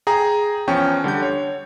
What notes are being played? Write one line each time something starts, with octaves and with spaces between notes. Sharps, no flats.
G#4 G5 G#5 A#5
E2 F3 C#4 G5 C#6
D3 G3 F#5 G6
C#5